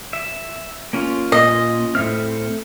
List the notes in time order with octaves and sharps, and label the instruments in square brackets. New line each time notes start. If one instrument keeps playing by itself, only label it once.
[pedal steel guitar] E5
A#3 C#4 F4
[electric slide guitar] A#2 [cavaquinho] D#5
[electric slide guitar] A2 C4 [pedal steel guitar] A4 E5 F6